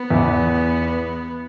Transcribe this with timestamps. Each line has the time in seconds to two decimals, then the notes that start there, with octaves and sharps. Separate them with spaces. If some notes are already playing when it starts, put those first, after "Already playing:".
Already playing: B3
0.10 E2 E3